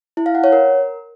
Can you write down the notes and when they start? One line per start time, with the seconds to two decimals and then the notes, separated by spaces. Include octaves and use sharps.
0.17 E4
0.26 F5
0.35 F#5
0.44 C#5
0.52 A#4